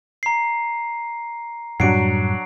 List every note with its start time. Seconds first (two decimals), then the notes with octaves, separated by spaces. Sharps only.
0.23 A#5 C7
1.80 F#2 A2 F#3 G3 D4 F#4 C7 D7